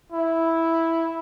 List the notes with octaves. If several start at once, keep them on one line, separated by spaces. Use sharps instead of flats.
E4